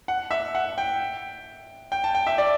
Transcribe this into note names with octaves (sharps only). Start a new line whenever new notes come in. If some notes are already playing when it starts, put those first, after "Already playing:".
F#5
E5
F#5
G5
G5
A5
G5
E5
D5